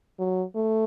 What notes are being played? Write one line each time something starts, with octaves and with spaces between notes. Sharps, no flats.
F#3
A3